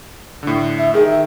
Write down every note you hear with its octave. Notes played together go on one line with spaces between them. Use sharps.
A2 D3
E5
D#3 G#4
E5